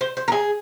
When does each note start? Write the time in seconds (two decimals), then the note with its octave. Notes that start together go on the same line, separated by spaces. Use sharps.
0.01 C5
0.17 C5
0.28 A#4
0.32 G#4